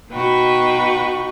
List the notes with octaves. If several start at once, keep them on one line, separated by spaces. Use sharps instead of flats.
B2 D#4 F#4 B4 G5 C#6